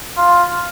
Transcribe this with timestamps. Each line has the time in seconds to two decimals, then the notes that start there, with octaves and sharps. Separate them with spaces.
0.17 F4